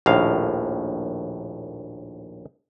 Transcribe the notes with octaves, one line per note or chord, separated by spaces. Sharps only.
A#1 D#2 A2 F5